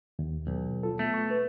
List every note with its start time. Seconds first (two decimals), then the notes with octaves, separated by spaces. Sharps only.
0.19 D#2
0.47 B1
0.83 F4 A4
0.99 A3 B3
1.14 C#6
1.31 B4